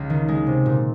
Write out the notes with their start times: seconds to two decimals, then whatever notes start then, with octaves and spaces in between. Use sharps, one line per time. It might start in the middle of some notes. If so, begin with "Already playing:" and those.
Already playing: C#2
0.10 D#3
0.28 G#3
0.47 C3
0.66 A#2